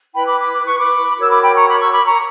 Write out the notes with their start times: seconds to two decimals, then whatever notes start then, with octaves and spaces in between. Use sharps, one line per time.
0.14 E4 B4 G5 B5
0.28 B5 D6
0.40 B5 D6
0.53 D6
0.66 C#6
0.78 B5 D6
1.17 F#4 A#4 C#5 E6
1.29 B5 D6
1.42 G5 B5
1.55 A#5 C#6
1.67 B5 D6
1.80 C#6 E6
1.93 B5 D6
2.05 A#5 C#6